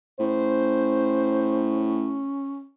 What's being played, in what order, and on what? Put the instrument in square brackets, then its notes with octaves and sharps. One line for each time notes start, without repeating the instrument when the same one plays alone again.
[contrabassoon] A2 [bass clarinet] C#4 [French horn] C5